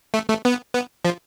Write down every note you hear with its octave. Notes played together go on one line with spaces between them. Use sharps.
A3
A3
B3
B3
F3